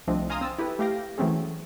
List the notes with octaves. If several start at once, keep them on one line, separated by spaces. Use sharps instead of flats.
C2 F3 A3 C4 D4 D#5
F5 G#5 A#5 C6 D#6 F6
C4 E6 A6
E4 G4 A4 B4
A3 G4 F5 G5 A#6
E3 F#3 A3 C4 C#4 G#4